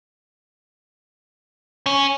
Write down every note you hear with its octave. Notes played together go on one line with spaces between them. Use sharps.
C#4